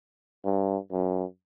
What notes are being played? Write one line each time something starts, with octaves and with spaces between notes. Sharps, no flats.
G2
F#2